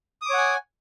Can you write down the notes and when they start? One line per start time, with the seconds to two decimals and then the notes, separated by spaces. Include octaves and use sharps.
0.22 D#6
0.26 D6
0.30 C#5
0.34 F#5
0.38 G#5